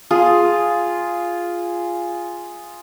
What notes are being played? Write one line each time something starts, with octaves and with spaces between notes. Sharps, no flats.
F4 G#4